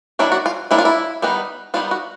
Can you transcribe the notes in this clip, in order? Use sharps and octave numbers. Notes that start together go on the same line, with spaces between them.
D#3 F#3 A#3 D4 E4
F#4
F4
D#3 F#3 A#3 D4 E4
F4
E4
D#3 G3 B3 D#4
D#3 G3 B3 D#4 F4
F#4